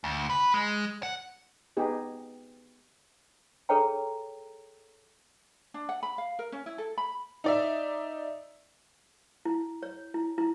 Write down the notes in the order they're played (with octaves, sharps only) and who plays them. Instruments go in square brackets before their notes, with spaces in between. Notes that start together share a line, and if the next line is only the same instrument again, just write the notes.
[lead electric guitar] D2
B4
G#3
F#5
[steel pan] B3 D#4 G4 G#4
[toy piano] G#4 A4 B4 C#5 G5 A#5
[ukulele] D4
F#5
B5
F5
A#4
C#4
E4
A4
B5
[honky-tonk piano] D#4 D5 E5
[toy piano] E4
C#5
E4
E4